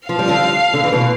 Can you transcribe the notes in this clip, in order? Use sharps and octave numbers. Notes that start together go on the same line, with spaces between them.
F3 F5
G3
D3 F3
D3
E3
B2 D3